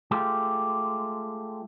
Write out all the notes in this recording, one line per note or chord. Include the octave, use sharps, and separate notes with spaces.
G#3 A3 F4 G4